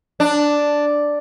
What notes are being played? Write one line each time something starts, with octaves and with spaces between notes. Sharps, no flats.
D4